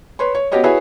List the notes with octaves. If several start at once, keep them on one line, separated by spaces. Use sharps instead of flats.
B4 C#5 C6
C#5
B3 C#4 F#4 G4 C#5 D#5
E4 F#4 G#4 B4 C#5 E5